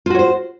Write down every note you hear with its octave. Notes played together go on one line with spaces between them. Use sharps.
F4 F#4 C5 C#5